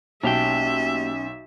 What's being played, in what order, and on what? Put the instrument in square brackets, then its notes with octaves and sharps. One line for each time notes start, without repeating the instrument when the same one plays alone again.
[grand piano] B1 [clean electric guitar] A#3 G4 G5 [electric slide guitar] C#4 A5 [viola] E5